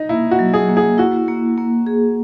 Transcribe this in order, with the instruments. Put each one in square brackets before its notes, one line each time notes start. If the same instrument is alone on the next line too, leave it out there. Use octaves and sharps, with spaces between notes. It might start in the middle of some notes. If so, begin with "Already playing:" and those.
Already playing: [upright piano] D#4
[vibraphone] A#3 [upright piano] E4
[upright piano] F#4
[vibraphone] F#3
[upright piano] G#4
[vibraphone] A#3
[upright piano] G#4
[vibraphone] E4 [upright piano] F#4
[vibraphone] A#3
A#3
G#4